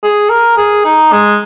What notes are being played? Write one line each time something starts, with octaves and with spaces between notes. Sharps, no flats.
G#4
A#4
G#4
D#4
G#3